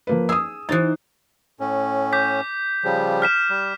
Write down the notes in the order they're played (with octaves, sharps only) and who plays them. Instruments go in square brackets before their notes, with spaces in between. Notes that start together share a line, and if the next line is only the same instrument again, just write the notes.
[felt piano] F3 A#3 B4
[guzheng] G#4 [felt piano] D#6 E6
[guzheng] E3 D#4 [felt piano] C5 A6
[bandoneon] A2 C#4
[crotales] D6 G6 B6
[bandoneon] C#3 F3 G3
[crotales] F6 B6 E7
[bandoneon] G3